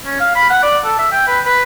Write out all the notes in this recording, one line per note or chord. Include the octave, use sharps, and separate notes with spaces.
C#4
F5
B5
F#5
D5
A4
E5
G5
B4
B4